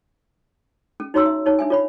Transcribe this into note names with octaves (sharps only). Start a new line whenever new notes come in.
C#4
D#4 F#4 C#5 A#5 C6 E6
E5
D#4 C#5 A5
D4 E5 G#5
F4 C#5 B5